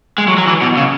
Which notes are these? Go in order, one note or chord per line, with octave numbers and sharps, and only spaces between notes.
G#3
F#3
F#3
E3
B2
C#3